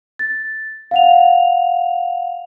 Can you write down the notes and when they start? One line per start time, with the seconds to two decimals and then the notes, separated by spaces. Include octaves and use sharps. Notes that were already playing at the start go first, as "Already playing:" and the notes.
0.19 A6
0.91 F5 F#5 F7